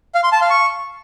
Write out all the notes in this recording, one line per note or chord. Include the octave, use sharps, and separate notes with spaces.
F5
C6
A5
F5
C#6